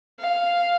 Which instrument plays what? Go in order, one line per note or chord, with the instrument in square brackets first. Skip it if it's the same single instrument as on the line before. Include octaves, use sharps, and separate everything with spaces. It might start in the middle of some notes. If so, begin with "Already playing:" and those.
[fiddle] F5